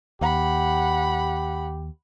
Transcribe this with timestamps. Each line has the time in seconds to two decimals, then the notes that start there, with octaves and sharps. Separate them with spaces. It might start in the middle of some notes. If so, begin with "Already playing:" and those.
0.21 D#2 G4 F#5 B5